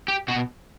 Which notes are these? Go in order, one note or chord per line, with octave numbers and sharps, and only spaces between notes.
G4
B2 F#4